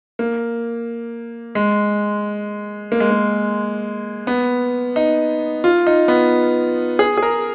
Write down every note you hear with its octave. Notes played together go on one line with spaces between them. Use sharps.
A#3
G#3
A#3
G#3
A#3
B3
D#4
F4
D#4
B3
G#4
G#4
A#4